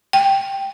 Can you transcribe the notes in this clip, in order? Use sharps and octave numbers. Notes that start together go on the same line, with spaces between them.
G5